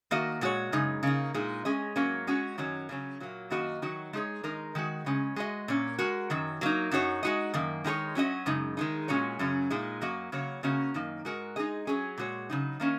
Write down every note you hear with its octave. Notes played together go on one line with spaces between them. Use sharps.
D#3 A#3 F#4 D#5
A#2 G#3 F#4 C#5
F#2 C#3 G#3 D#4
C#3 A#3 D#4
A#2 G#3 D#4
G#3 C#4 G#4 D#5
G#2 F#3 A#3 C#4 A#4
G#3 C#4 F#4 C#5
F#2 D#3 F#3 C#4
C#3 F#3 C#4
A#2 F#3 A#3
F#2 D#3 A#3 F#4 D#5
D#3 F#3 D#4 F#4
G#3 D#4 G#4 C#5
D#3 G#3 D#4 A#4
D#3 G#3 F#4
C#3 G#3 C#4
G#3 F#4 D#5
A#2 A#3 C#4
G#3 F#4 A#4
F#2 D#3 F#3
F#3 A#3 D#4
F#2 F#3 D#4 F#4 C#5
G#3 D#4 F#4 D#5
F#2 D#3 A#3
D#3 G#3 D#4 G#4 C#5
F#3 C#4 F#4 D#5
F#2 C#3 G#3 D#4
D#3 G#3 D#4
A#2 G#3 C#4 F#4 C#5
F#2 C#3 F#3 C#4
A#2 G#3 D#4
F#2 F#3 A#3 F#4 D#5
C#3 F#3 A#3 F#4 C#5
C#3 A#3 C#4 F#4 D#5
F#2 D#3 A#3 D#4
G#2 G#3 F#4 A#4
G#3 D#4 G#4 D#5
F#3 C#4 G#4
A#2 G#3 F#4 C#5
C#3 F#3 D#4
D#3 A#3 C#4